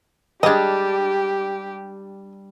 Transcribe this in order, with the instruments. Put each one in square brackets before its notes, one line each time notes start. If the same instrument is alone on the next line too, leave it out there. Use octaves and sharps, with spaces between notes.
[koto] G3 D4 [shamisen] G#3 D#5 [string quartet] G4